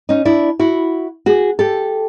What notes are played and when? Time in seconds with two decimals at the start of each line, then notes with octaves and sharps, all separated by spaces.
0.09 C#4 D#4
0.25 D4 E4
0.59 E4 F#4
1.26 F#4 G#4
1.59 G4 A4